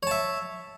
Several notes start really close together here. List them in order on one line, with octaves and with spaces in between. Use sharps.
C#5 A5 E5